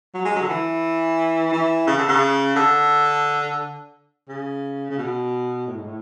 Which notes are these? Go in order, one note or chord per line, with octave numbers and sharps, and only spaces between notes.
F#3
G#3
F#3
D3
E3
E3
C#3
D3
C#3
D3
C#3
C#3
B2
A2
G#2
A2